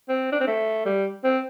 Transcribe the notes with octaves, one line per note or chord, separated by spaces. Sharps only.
C4
D4
C4
A3
G3
C4